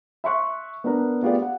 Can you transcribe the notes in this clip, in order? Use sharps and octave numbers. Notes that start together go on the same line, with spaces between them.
E5 C6 C#6 F#6
B3 D4 A#4
A3 B3 F4 G4 G#4 D5
F#5